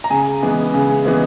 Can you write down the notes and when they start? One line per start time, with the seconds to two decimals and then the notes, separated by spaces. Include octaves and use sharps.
0.04 A#5
0.10 C#3 G#5
0.42 E3 G#3 B3
0.74 C#3
1.05 E3 G#3 B3